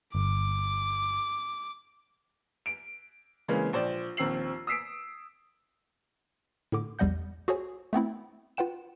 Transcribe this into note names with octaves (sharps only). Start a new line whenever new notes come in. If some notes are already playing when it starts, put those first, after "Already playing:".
G1 D6
D7
C#3 E3 G#3 A#3 C4 C#4
A#1 C5 D5
A#1 D#2 C4 E6 C7 F#7
D#6 E6 B6 C7 D7
A2 D3 D6
A#1 E2 G3 D#5 F#5 G6
F#4 G#4 A4 C5 C#5 G#5
A3 B3 C4 E4
F4 B4 F#5 G5 E7